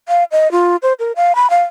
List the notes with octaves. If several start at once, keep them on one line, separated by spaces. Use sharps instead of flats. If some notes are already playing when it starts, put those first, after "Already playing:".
F5
D#5
F4
C5
A#4
F5
B5
F5